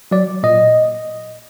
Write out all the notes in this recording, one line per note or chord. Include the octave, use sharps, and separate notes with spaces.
F#3 D5
A#2 D#5